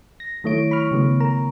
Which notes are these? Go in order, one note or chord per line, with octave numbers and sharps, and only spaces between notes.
A#6
D#3 F#3 A3 E4 C#5 D7
B5 C#6 F6
C#3 F#3 G#3 A3 B3
A#4 A#5